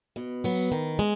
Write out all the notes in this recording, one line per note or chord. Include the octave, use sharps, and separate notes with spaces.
B2
F#3 B3
D#3
G#3